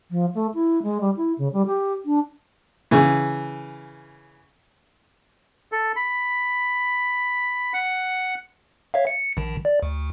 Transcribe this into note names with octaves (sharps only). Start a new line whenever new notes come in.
F3
A3
E4
G#3
G3
E4
C#3
G3
G4
D4
C#3 E3
A4
B5
F#5
C#5 E5 F5
C#7
A#1 D#3
D5
D2